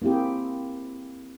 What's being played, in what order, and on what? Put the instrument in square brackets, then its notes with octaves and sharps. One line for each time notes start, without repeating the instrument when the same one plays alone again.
[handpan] A#3 C4 E4 G4 G#4